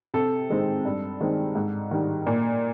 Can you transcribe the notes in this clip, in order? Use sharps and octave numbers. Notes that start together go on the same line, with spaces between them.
C3 A4
D#3 G#3 C4
G2
D#3 G#3 C4
G#2
D#3 G3
A#2